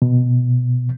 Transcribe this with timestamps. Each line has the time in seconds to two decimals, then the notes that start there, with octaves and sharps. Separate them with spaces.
0.02 B2